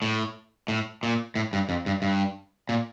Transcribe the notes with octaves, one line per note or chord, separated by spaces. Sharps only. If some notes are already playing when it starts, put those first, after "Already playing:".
A2
A2
A#2
A2
G2
F2
G2
G2
A#2